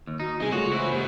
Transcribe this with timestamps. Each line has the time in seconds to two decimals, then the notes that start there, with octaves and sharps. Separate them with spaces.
0.07 D#2
0.20 D#4 F#4
0.41 C2 B3 D#4 G#4 D#5 G#5
0.52 C#3 G#3 A3 F4 F#4 C#5
0.72 E4 B4 C5
0.92 G#2 A#3 G4